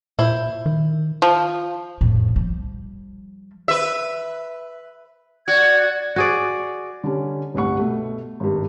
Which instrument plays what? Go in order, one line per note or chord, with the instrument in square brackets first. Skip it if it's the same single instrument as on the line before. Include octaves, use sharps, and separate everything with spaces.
[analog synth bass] A#2 [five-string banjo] E4 C5
[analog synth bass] D#3
[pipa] F3
[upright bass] F2 A2
F3 G3
[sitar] B4 E5
[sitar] F#4 [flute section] D5 G#6
[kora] F#4 G#4 D5
[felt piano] D3 G3 C#4
G1 C2 A2 F#5 C#6
B2 A3
G#1 G2